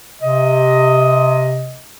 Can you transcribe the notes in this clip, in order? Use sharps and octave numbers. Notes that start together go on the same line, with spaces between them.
C3 D#5